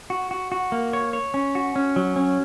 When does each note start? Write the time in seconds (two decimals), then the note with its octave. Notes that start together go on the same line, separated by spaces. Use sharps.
0.10 F#4
0.31 F#4
0.52 F#4
0.72 A#3
0.93 C#5
1.13 C#5
1.34 C#4
1.55 F#4
1.76 C#4
1.96 F#3
2.16 C#4